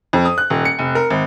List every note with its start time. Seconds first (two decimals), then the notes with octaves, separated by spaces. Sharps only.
0.13 F2
0.25 D#6
0.38 F#6
0.50 D#1
0.65 C#7
0.79 F1
0.95 A#4
1.10 G#1